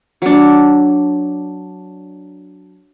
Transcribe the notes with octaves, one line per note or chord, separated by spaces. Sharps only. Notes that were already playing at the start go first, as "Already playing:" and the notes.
F#3 D4